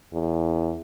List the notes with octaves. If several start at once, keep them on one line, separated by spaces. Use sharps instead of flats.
E2